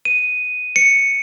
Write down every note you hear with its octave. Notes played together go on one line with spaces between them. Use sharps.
D#7
C#7